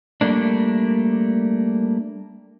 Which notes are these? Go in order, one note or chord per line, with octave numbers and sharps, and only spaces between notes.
G3 A3 A#3 D4